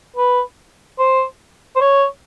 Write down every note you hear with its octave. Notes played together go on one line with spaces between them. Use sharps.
B4
C5
C5
C#5